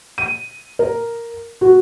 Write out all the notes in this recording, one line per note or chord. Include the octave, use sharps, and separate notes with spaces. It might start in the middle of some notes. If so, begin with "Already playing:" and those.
D#7
A#4
F#4